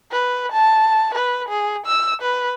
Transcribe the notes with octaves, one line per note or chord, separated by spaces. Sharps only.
B4
A5
B4
G#4
E6
B4